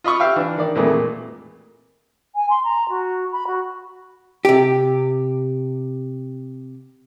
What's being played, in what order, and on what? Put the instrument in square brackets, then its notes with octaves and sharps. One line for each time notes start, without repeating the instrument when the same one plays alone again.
[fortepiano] F4 D#5 B5 C#6 D#6
G4 E5 F5 G5
E3 D4
D#3 D5
F2 A#2 D#3 E3 G#3 A3
A#2
[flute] G#5
C6
A#5
F#4
B5
F#4
[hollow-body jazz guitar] C3 G4